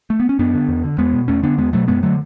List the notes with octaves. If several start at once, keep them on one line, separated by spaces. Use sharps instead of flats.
A3
B3
C#4
F#2 B3 D4
D3
E2
D3
E2 G#3 B3
B2
E2 A3 C#4
D3 B3 D4
E2 G#3 B3
B2 F#3 A3
F#2 G#3 B3
D3 F#3 A3